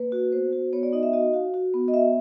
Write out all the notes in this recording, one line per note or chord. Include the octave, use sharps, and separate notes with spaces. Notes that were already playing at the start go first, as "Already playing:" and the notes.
Already playing: A#3 B4
F#4
B3 C5
F#4
B3 C#5
D5
D#4 D#5
E5
F#4 D#5
F#4 F5
F#4
B3
D#5
B3 E5